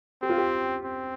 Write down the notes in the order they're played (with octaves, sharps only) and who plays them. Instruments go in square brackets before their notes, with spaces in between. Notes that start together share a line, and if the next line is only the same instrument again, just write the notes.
[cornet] C4 [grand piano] G4
[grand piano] F4
G4
[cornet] C4